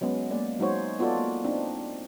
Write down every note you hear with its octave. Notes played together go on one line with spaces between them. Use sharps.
F#3 G#3 B3 C#4
G#3 A#3 D5
F#3 G#3 D#4 F#4 C5 C#5
B3 F4 F#4 A4 D5
A#3
C4 D4 D#4